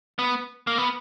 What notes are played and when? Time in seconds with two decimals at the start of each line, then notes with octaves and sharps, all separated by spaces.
0.19 B3
0.67 A#3
0.78 B3